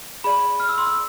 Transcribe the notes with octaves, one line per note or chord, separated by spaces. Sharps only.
G#4 D5 B5
F6
E6
C6
E6